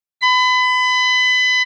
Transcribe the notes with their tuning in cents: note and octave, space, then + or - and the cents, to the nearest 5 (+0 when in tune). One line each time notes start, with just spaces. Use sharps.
B5 +30